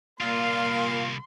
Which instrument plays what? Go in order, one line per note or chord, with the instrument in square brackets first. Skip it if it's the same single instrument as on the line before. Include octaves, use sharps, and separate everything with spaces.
[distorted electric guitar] C2 F4 [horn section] A#2 F5 [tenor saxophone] A#3 [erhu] C6